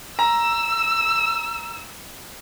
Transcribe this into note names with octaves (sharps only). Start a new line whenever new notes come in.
A#5 E6